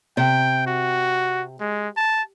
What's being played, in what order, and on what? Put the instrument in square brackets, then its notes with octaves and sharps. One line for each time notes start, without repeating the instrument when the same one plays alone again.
[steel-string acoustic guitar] C3 [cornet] G5
[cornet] F#4
G#3
A5